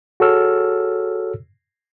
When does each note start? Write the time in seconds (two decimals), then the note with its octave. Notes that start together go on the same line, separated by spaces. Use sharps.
0.20 F#4 G#4 A4 C#5 E6 F6